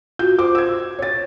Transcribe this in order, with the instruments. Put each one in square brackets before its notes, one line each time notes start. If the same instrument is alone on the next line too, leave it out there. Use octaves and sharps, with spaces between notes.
[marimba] F4 F#4 [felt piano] G6
[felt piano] C5 D6
E6 G#6
C#5 A6